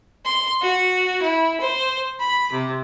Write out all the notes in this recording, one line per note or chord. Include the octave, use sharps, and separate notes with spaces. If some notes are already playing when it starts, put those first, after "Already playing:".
C6
F#4
E4
C5
B5
C3